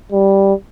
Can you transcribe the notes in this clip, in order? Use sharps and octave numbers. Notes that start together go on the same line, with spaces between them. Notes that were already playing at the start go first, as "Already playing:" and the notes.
G3